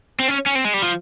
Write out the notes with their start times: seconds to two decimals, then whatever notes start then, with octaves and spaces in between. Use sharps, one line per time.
0.19 C4
0.28 C#4
0.46 C#4
0.55 C4
0.65 G#3
0.74 G3
0.83 F3